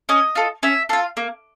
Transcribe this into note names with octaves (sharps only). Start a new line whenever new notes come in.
C#4 D#5
F4 A4
C#4 E5
F4 A4 F5
A#3